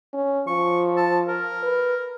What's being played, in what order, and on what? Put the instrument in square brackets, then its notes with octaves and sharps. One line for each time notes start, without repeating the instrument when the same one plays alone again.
[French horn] C#4
[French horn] F3 [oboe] C#6
[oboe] A5
A#4
[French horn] B4